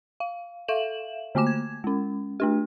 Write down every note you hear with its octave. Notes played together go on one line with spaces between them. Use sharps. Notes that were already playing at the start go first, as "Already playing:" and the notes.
F5
A4 E5 F5 E7 F#7
D3 A3 A#3 D6 E7
G#6
G#3 C#4
A3 D4 G4